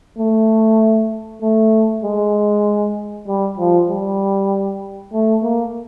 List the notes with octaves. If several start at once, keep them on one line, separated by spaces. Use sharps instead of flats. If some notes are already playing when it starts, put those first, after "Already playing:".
A3
A3
G#3
G3
F3
G3
A3
A#3